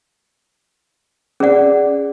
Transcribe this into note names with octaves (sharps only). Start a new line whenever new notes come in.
C#4 G#4 D5 F#5